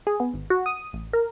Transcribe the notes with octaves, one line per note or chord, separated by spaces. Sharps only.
G#4
B3
G#1
F#4
D#6
A1
A#4